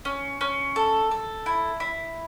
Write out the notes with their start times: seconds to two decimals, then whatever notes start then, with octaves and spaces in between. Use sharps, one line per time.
0.05 C#4
0.41 C#4
0.76 A4
1.11 A4
1.46 E4
1.80 E4